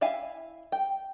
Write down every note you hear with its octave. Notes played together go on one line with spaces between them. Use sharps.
E4 E5 F5 G#5
G5